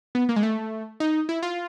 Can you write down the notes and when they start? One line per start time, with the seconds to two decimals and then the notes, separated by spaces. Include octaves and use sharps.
0.15 B3
0.29 A#3
0.36 G#3
0.43 A3
1.00 D#4
1.29 E4
1.43 F4